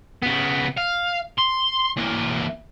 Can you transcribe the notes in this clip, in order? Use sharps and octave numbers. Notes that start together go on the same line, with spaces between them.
C#3 B3
F5
C6
E3 A#3